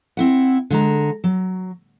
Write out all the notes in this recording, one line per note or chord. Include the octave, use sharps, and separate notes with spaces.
C4 E4 F#5
D3 G#3 A#5
F#3